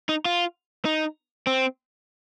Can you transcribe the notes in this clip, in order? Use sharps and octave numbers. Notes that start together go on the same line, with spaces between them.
D#4
F4
D#4
C4